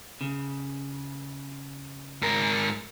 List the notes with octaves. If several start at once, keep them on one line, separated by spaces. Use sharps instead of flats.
C#3
G#2 A#4